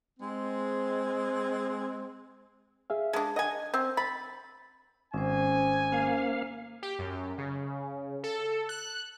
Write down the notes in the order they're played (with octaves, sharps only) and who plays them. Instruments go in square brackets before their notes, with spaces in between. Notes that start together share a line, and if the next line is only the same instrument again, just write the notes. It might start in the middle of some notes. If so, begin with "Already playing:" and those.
[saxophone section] G#3 C4
[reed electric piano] G#4 E5 F5
[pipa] G#3 D4 [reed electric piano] A5
[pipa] D#5 G#5 [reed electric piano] F#5 G#6
[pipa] C4
[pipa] B5 [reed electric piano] A6
[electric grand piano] G#1 [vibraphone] C#4 C5 [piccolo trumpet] G#5
[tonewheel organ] A#3 F5
[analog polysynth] G4
F#2
C#3
A4
F#6